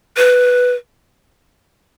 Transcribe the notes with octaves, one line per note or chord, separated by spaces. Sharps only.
B4